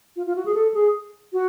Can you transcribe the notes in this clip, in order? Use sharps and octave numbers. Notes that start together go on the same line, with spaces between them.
F4
F4
F#4
G#4
A4
G#4
F#4